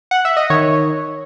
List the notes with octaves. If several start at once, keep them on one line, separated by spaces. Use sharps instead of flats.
F#5
E5
D#5
D#3 C#5